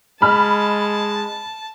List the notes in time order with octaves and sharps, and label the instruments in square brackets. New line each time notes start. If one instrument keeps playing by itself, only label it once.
[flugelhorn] G#3 [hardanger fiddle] A5 [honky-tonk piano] B5 F6